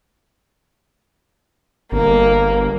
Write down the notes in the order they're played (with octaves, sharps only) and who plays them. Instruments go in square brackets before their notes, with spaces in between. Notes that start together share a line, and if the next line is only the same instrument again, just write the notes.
[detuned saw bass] G1 [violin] A#3